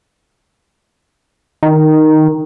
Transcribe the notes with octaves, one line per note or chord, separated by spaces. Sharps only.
D#3